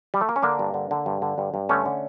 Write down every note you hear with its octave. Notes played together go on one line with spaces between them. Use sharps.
G3
A3
A#3
C#4
D3 A#3 D4
G2
D3
D3
G2
D3
G2
G2
D3 A3 C#4
D3